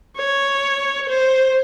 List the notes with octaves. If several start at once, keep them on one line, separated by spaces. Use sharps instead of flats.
C#5
C5